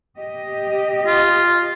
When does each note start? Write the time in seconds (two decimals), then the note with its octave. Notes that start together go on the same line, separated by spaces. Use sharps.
0.17 G4 D#5
1.07 F4